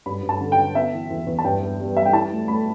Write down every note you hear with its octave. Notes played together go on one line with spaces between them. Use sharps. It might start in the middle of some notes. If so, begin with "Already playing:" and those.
G2 B5
G2
A5
D3
G5
D3
B3 E5
E3
E2
E2
A5
G2 G5
B3
G3
G3 E5
G5
E4 A5
A3
A3 B5